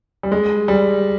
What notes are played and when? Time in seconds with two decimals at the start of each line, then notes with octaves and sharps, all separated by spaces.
0.23 G3
0.32 G#3
0.68 G3